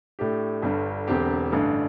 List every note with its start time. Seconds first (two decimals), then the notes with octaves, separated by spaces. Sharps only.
0.19 A2 A3 D4 G4
0.62 G1 G2 D3 G3
1.08 E1 E2 D3 C4 G4
1.52 A1 G2 D3 A3